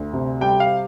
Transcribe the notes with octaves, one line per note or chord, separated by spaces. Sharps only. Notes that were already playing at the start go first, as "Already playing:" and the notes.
Already playing: D2
C3
G3 G5
F5